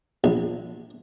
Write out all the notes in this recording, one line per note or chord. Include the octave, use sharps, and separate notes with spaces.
A#1